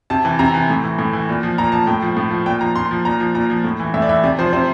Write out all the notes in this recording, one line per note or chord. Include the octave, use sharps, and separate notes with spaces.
C3 A5
E3
C3 A#5
E3
A2
E3
A2
E3
A#2
F3
A#2 A#5
F3 A5
A2 G5
F3
A2
F3
A#2 G5
F3 A#5
A#2 C6
F3
A#2 A#5
F3
A#2 A#5
F3
A2
E3
A2 E5
D5
E3 E5
C3 D5
F3 C5
C3 C5